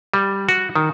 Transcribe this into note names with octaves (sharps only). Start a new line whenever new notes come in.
G3
F#4
D#3